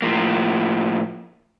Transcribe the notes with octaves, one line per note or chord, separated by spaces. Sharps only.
A2 F3 A#3